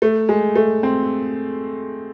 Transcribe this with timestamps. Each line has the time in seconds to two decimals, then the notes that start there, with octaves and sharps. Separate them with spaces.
0.02 A3
0.29 G#3
0.55 A3
0.83 C4